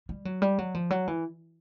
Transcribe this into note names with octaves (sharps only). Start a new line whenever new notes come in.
G3
F#3
G3
F#3
F3
F#3
E3